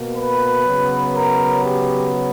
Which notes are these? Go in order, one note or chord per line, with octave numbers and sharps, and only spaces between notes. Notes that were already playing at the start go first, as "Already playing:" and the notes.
Already playing: B2 A#3
B4
C#3 F#3 B3
A#4
G4